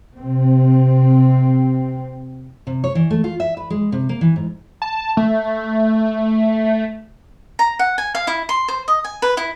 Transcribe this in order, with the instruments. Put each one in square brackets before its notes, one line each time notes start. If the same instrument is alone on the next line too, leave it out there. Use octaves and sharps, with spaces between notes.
[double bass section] C3 C4
[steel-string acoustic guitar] C3
C#5
E3
A3
F4
E5
B4
G#3
C3
A#3
E3
G#2
[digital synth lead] A5
A3
[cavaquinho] A#5
F#5
G#5
F5
E4
C6
C5
D#5
G#5
B4
E4